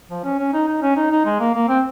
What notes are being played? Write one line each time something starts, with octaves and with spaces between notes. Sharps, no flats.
F3
C#4
C#4
D#4
D#4
C#4
D#4
D#4
G#3
A#3
A#3
C4